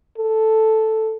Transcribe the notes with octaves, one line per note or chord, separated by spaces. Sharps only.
A4